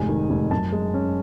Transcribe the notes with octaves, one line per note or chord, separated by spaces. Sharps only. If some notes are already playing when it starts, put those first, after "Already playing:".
Already playing: F1 G#2 G#5
D#3
F1
F#2 A5
G#3
C#4